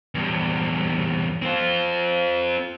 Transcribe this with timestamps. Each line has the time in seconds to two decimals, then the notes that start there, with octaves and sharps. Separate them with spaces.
0.15 E2 G2
1.42 C4 F4